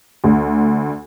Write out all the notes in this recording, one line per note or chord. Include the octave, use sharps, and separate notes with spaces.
D2